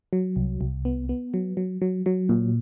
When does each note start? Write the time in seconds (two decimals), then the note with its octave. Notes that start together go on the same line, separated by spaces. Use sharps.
0.13 F#3
0.36 C2
0.61 C2
0.85 B3
1.09 B3
1.34 F#3
1.57 F#3
1.82 F#3
2.06 F#3
2.29 A#2